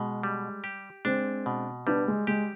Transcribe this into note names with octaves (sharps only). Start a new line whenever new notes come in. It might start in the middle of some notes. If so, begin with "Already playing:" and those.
Already playing: B2 G#3
G3
G4
G#3 C4 D4
B2
G3 B3 D4
G#3
G#3 G4